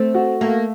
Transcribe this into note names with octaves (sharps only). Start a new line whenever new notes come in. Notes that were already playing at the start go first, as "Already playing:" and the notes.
Already playing: A3 C4
F#4
A3 A#3